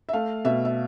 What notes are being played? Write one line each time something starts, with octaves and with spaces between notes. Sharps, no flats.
E5
A3 F5
B2 E5
E5